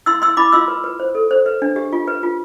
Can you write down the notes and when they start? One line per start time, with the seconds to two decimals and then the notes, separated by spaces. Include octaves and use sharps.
0.06 E4 C6 E6
0.22 E4 C6 E6
0.37 E4 B5 D6
0.52 F4 C6 E6
0.68 B4
0.84 B4
0.99 C5
1.15 A4
1.31 C5
1.46 B4
1.62 D4
1.76 G4
1.93 F4
2.08 B4
2.23 F4